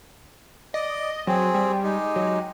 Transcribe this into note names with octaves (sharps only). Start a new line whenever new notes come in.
D5 D#5
F#3 C4 G#4
G3
G#3 D#4 G4
F#3